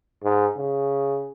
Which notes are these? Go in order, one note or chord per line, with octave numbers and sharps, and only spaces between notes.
G#2
C#3